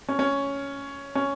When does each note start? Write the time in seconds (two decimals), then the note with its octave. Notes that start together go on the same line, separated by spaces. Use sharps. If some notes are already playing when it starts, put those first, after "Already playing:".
0.08 C#4
0.19 C#4
1.15 C#4